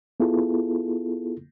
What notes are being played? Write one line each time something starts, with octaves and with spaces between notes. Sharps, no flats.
B3 E4 F4 G#4 A4